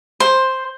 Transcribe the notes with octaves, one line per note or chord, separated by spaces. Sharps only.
C5